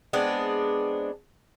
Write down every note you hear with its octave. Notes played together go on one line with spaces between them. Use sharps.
G#3 B3 C4 D4